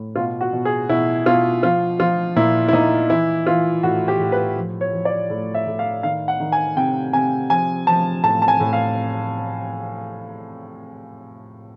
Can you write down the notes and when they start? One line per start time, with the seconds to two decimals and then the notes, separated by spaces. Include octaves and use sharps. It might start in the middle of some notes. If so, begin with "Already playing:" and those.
Already playing: A2
0.16 B2 F4
0.41 F#4
0.53 B2
0.65 G#4
0.89 B2 E4
1.26 B2 F4
1.63 F3 F4
2.00 F3 F4
2.36 A#2 E4
2.68 E4
2.73 A#2 D#4
3.10 E3 E4
3.46 E3 F4
3.83 A2 F#4
4.08 G4
4.20 A2
4.32 B4
4.56 F3
4.81 C#5
4.93 F3
5.05 D5
5.30 A2
5.55 E5
5.67 A2
5.79 F5
6.03 D#3 F5
6.28 F#5
6.40 D#3
6.52 G#5
6.76 C3 G5
7.13 C3 G#5
7.50 F3 G#5
7.87 F3 A5
8.24 A2 A5
8.42 A5
8.48 G#5
8.60 A2
8.73 F5